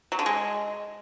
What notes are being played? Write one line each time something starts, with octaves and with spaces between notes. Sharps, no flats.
F#3
D3
G#3